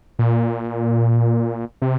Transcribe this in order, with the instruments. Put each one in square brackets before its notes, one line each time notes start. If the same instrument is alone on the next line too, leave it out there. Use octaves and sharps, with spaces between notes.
[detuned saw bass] A#2
C3